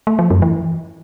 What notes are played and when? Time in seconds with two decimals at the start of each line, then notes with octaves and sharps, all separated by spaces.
0.07 A3
0.19 F3
0.30 F#2
0.42 E3